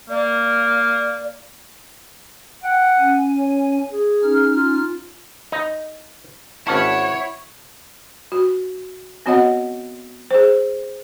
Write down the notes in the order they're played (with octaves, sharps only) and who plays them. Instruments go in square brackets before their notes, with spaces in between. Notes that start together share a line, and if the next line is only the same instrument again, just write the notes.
[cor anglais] A#3 [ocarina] D5
[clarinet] F#5 [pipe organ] G5
[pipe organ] C#4 G#5
[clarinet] C#5
G#4
[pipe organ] C#4 D#4 F6
[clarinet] F4
[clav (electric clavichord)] D#4
[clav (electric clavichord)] G#1 C#4 A5 [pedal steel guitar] E4 F#5 [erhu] C#5
[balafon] F#4
B3 C4 F#4 C#5 D#5 F#5
G#4 C5